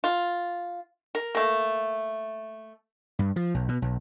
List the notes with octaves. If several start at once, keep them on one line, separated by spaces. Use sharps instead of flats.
F4
A#4
A3 A#3
G2
F3
B1
B2
B1